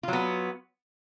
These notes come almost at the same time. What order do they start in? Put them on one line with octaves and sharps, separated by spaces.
F4 F#3 B3